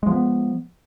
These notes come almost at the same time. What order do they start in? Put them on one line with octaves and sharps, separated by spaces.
G#3 F3 B3